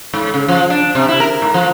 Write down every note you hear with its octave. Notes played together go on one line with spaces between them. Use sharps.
G#2
C#3
F3
D4
C3
E4
A#4
G#2
F3